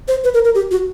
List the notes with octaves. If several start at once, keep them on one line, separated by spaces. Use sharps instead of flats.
C5
B4
A#4
A#4
G4
F#4